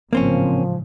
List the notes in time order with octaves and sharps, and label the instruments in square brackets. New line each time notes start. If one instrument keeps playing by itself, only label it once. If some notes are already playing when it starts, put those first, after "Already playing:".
[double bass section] A1 G#2 C#3 [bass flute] F3 [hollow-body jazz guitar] A#3 C4 C#4